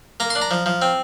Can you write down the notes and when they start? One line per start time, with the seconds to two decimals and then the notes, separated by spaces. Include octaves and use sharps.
0.20 A#3 A#5
0.30 C6
0.35 D4
0.42 A#5
0.51 F3
0.66 F3
0.82 C4